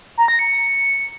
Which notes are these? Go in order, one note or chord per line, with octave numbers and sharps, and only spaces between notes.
A#5
A#6
C#7